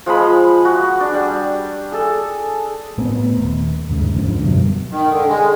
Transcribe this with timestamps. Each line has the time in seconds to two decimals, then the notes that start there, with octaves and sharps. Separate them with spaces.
0.06 F3 G#3 G#4 B5
0.65 F#4
1.00 D4
1.14 G3
1.92 G#4 A4
2.98 A2 A3 B3 C4
3.37 D#1
3.90 D#2 G#2 C#3
4.16 F2 G#2 D3 F3
4.43 F#2 B2 F#3 G3
4.91 D#3
5.10 D3
5.27 G#3